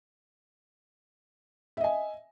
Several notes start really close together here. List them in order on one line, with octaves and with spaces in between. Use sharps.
E5 D#5 G#5